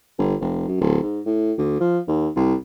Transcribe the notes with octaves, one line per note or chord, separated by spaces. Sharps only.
G1
F1
F#2
D1
G#2
A2
D2
F3
D#2
C2